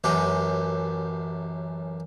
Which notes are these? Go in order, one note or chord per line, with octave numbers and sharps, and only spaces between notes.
A1 F#2 G4